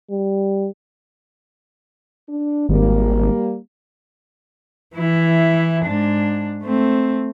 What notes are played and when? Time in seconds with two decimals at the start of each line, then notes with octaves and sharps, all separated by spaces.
0.10 G3
2.29 D4
2.69 G#1 G3 A#3
4.95 E3 E4
5.85 G#2 D4
6.64 A3 C4